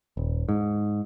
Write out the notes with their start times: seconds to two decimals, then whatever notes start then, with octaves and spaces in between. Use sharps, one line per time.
0.17 D#1
0.49 G#2